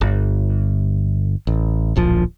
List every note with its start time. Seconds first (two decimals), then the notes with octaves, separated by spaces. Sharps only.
0.01 G1
1.47 A1
1.96 D1 A#1 F3